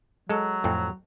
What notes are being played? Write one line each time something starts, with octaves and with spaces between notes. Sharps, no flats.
F#3 G#3 A4
F2 A2 C4